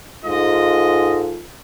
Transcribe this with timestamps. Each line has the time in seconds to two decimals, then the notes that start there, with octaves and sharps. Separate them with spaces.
0.25 G#2 G#3 F4 A4 D#5